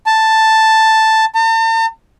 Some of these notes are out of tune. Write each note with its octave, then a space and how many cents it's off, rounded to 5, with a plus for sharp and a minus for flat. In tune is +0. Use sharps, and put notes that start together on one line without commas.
A5 +5
A5 +45